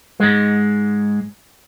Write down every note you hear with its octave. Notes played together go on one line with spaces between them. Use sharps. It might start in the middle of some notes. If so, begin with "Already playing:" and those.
G#2 G#3